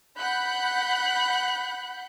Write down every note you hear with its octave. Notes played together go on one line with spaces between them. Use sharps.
F#5 B5 F#6 G6